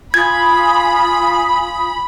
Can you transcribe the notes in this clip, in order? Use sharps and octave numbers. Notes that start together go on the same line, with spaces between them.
F4 G#5 B5 D#6 G#6